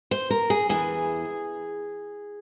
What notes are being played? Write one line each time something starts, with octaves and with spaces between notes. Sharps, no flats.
C5
A#4
G#4
E2 E3 G#4